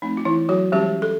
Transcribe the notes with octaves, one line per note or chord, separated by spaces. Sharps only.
F3 A3 C4 D#4
F4
E3 E4
F#3 F#4
E3 G3 G#3 C#4 G4
A4